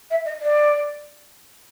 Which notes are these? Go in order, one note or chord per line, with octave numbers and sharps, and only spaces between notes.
E5
D#5
D5